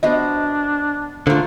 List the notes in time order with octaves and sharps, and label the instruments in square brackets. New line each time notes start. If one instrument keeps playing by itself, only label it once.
[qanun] B3 F#4 C5 [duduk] D4 [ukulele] D#5
[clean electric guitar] D3 [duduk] A3 [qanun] A#3 F4 [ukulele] C5